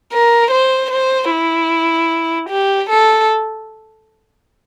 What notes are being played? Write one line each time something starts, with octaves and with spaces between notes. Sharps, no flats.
A#4
C5
C5
E4
G4
A4